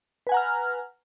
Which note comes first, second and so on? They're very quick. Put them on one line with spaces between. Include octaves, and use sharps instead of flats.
B4 G#5 F#5 A#5 F6